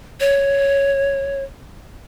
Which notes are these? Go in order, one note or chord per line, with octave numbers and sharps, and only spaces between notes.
C#5